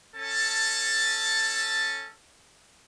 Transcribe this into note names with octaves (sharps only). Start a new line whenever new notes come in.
C#4 A4 A5